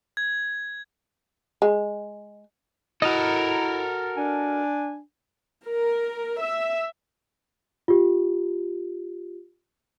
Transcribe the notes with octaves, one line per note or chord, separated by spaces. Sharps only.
G#6
G#3
E4 F#4 A4 A#4 D#5
D4 G#5
A#4
E5
F4 G4